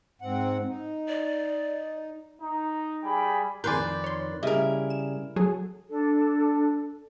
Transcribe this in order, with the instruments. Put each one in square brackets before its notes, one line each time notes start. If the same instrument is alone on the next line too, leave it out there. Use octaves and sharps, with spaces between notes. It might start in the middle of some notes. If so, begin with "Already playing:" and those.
[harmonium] G#2 C4 F#5
D#4
[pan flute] D5
[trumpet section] D#4
G3 G#4 G5 B5
[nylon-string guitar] F2 D#3 A#4 [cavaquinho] B4 D5 [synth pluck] G#5 C6 G6
[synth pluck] C#5 C6
[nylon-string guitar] C#3 G3 [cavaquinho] E4 A#4 [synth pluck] D#5
[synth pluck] E7
F#3 G#4 A4
[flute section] D4 A4